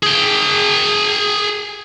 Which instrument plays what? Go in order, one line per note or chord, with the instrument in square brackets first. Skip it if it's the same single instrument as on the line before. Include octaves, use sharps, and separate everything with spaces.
[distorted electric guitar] G#4 G5